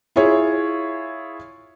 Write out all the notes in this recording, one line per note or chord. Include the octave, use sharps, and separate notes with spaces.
E4 F4 G#4 C#5